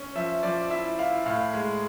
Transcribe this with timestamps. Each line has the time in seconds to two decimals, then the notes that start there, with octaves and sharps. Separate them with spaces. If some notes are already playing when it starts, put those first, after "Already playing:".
Already playing: C#4
0.15 F3 E5
0.43 F3 D5
0.70 E4 E5
0.98 E4 F5
1.26 A2 F5
1.54 G#3